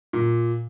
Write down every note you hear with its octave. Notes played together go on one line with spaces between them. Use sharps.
A#2